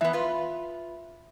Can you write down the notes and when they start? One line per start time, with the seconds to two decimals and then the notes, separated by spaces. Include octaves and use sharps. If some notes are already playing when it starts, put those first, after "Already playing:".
0.01 E3 B3 E5
0.13 F4 B4